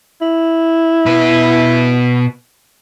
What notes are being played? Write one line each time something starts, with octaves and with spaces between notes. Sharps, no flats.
E4
B2 B4